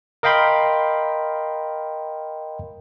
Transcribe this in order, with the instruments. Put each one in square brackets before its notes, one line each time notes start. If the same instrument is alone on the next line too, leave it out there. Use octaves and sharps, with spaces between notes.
[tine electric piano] A#4 D#5 F5 G5 B5 C6